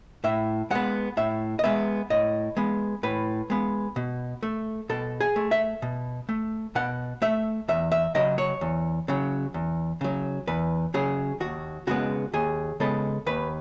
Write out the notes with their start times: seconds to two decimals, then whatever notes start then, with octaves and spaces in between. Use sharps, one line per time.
0.24 A2 E5
0.70 G#3 B3 F#5
1.17 A2 E5
1.59 D#5
1.64 G#3 B3 E5
2.10 A2 D#5
2.57 G#3 B3
3.03 A2 B4
3.50 G#3 B3
3.96 B2
4.43 A3
4.89 B2 A4
5.20 G#4
5.36 A3
5.51 E5
5.82 B2
6.29 A3
6.75 B2 F#5
7.22 A3 E5
7.68 E2 E5
7.92 E5
8.15 C#3 F#3 D#5
8.38 C#5
8.61 E2
9.08 C#3 F#3
9.54 E2
10.01 C#3 F#3
10.47 E2 B4
10.94 C#3 F#3 G#4
11.40 D#2 F#4
11.87 C#3 G#3 B3 F#4
12.33 D#2 G#4
12.80 C#3 G#3 B3 A4
13.26 D#2 B4